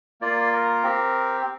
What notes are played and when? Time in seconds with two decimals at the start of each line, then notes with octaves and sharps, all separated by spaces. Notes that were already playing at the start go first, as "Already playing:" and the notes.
0.21 A#3 F4 D5
0.53 A#4
0.83 C4 G4